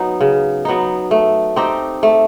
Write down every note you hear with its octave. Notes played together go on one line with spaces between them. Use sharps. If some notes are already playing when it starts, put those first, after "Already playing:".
Already playing: F#3 B3 D#4
C#3
F#3 B3 D#4
A3
C4 D#4 G4
A3